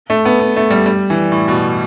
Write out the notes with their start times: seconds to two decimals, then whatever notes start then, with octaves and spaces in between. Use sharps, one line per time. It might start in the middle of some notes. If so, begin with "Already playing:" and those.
0.10 A3
0.25 B3
0.40 B3
0.56 A3
0.71 G3
0.86 G3
1.10 E3
1.32 A2
1.48 B2